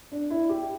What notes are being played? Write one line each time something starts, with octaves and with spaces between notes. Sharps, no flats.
D4
E4
G4